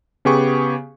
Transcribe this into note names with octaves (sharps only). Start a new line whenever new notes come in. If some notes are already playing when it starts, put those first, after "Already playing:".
C#3 B3 G4 G#4 C#6